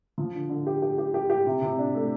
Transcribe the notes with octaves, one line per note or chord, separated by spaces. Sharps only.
F3
D3
D3
G4
G4
G4
G4
G4
C3
C3
D4
A3